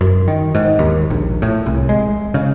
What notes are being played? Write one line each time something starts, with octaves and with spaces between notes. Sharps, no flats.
F#2
D#3
G#2
D#2
A#1
A2
C2
G#3
C#3